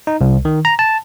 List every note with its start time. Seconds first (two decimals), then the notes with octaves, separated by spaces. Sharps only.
0.07 D#4
0.21 C2
0.45 D#3
0.65 A#5
0.79 A5